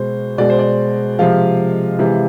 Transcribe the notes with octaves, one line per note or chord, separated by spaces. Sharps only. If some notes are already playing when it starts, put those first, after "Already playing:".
Already playing: B2 G#3 C5
B2 G#3 D5
C5
D5
C3 F3 G#3 F5
C3 E3 G#3